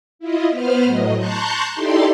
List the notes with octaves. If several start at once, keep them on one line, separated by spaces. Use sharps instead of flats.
E4 F4 D#5
B3 B4 C5 F6
A2 F#3 D#5
A5 A#5 C6 C#6 F#6 G6
D#4 E4 G4 A4 D5 C6